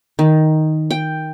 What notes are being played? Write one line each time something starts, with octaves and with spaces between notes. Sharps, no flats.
D#3
G5